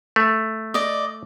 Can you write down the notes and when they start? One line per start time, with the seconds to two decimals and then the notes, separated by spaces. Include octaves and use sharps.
0.16 A3
0.74 D5 D#5